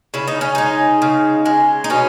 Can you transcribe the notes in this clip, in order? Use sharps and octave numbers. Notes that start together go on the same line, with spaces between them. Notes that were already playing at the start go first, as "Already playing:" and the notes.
C#3 E4
D#4
C#4
G#3 D#4
C#3
G#3
D#4
B2 C#4